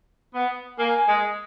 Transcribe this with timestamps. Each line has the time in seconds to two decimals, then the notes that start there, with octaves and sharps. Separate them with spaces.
0.35 B3
0.79 A#3 G#5
1.08 G#3